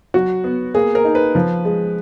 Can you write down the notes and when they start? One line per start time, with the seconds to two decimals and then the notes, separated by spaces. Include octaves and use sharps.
0.14 F#3 F#4
0.44 B3
0.74 A#3 G#4
0.95 A#4
1.05 D#4
1.15 B4
1.35 F3
1.65 G#3